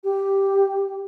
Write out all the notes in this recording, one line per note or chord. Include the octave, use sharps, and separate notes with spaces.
G4